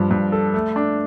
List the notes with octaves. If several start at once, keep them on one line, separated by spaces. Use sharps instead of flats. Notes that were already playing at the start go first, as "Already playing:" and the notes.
Already playing: G2 F3
G2
A4
A3
D4